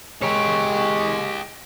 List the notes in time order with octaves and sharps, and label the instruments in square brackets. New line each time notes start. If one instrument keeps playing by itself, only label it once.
[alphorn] G#3 [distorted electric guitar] G4 C#5